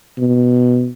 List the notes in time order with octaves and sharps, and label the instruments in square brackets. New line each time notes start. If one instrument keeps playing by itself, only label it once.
[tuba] B2